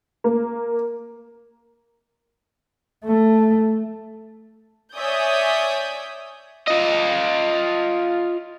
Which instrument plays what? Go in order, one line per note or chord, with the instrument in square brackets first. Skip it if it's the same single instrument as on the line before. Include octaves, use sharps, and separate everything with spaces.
[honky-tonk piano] A#3
[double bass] A3
[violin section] C#5 D5 E5 G#5 D#6 G6
[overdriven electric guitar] F4 D#5